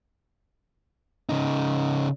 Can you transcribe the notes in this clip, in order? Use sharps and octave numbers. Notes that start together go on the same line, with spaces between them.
C#3 D#4